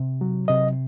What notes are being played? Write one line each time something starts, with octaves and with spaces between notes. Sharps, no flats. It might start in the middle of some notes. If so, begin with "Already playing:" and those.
Already playing: C3
F#3
C3 D#5